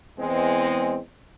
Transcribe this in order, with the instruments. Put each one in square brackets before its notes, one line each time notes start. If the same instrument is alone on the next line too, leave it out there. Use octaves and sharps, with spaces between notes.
[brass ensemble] E2 G#3 C4